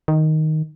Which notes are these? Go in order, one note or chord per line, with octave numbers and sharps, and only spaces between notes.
D#3